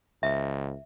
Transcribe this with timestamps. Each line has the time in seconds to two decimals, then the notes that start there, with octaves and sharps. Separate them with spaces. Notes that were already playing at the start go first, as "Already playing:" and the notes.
0.23 C#2 E5